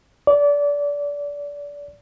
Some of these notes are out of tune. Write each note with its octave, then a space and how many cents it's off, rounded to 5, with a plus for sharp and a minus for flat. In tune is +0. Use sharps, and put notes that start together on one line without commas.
D5 -25